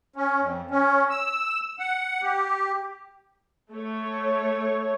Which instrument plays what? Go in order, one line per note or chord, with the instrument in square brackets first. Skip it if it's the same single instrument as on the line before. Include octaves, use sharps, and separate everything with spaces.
[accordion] C#4
F2
C#4
E6
F#5
G4
[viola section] A3 C#5